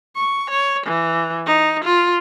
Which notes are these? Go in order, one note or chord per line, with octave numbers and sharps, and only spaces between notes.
C#6
C#5
E3
D#4
F4